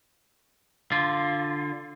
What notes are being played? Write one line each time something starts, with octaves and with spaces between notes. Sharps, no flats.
D3 F4